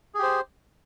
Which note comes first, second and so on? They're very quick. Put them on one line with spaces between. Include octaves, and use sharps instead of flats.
G#4 G4 C5